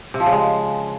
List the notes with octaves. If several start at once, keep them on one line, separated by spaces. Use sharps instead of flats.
C3
F3
C#3
G#3